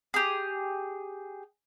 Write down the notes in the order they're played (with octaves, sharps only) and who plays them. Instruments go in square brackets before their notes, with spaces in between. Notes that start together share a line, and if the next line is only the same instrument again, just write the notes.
[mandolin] G4 G#4